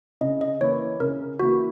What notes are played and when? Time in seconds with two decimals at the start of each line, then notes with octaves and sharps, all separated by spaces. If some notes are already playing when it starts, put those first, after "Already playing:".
0.21 C#3 D#5
0.41 D#5
0.61 E3 A#3 E4 C#5
1.00 C#3 A#4
1.39 E3 A#3 E4 F#4